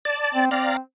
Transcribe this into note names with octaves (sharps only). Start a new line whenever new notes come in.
D5 A5
C4
C4 D5 F5 A#5